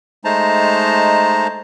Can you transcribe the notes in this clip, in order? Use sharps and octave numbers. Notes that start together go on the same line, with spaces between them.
G#3 A3 D#4 C5 A5 A#5